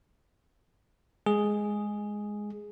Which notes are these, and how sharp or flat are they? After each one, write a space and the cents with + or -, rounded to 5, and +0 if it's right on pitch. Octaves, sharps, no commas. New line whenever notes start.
G#3 +0 G#4 +0